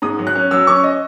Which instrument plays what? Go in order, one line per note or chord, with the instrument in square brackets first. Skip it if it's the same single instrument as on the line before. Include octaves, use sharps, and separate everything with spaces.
[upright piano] G#2 D#6
F#3
F#6
C#4
F#3 E6
C#4 C#6
D#5